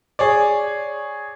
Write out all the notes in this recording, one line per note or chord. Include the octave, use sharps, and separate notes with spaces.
G#4 C#5 D5